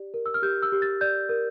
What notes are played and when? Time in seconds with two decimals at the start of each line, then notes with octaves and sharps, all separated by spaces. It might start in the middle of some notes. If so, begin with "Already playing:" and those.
Already playing: G4 D5
0.14 A#4
0.26 E6
0.34 F6
0.42 G4 G6
0.63 E6
0.72 G4
0.82 A6
1.01 D5 G6
1.29 A#4